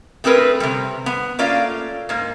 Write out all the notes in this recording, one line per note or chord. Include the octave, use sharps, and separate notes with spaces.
A3 C4 G#4 A#4 B4
C3 G3
B3
A3 A#3 C#4 F4 D5 F5
G#2 A#3